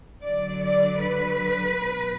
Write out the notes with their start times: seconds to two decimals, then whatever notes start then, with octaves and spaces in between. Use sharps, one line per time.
0.23 D3 F#3 D5
0.62 D5
1.00 B4
1.78 B2 F#3